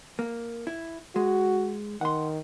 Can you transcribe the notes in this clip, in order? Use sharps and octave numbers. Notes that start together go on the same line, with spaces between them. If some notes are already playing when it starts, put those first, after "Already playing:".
A#3
E4
G#3 F#4
D#3 F#5 C6